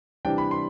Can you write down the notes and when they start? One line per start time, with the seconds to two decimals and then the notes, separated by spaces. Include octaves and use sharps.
0.25 C3 E3 G3 D4 G5
0.38 B5
0.51 C6